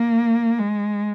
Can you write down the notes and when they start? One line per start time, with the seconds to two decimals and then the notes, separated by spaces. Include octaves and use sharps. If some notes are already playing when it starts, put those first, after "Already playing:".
Already playing: A#3
0.58 G#3